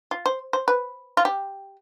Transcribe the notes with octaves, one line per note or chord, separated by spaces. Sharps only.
F4
C5
C5
B4
F4
G4